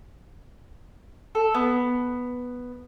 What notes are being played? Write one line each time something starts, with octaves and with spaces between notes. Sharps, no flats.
A4
B3